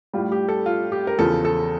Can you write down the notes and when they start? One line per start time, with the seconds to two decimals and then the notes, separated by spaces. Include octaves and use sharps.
0.14 A2 G3 F4
0.32 G4
0.49 A4
0.66 F4
0.92 G4
1.07 A#4
1.19 E2 C#3 F3 A4
1.45 A4